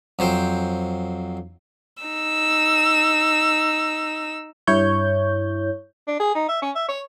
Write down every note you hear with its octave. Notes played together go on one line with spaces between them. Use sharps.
F2 F#3 C5 G5
D#4 E6
G2 E4 C#5 G6
D4
G#4
D#4
E5
C#4
E5
C#5